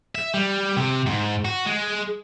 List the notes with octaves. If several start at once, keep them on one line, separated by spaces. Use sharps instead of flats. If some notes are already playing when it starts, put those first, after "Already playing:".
E5
G3
C3
G#2
F#4
G#3